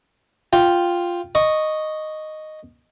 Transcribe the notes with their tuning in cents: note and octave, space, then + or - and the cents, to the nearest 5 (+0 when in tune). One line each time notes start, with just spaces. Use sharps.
F4 +0 G5 +0
D#5 -5 C#6 +0